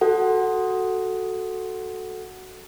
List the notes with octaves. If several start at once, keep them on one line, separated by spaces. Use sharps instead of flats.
F#4 A4 F#5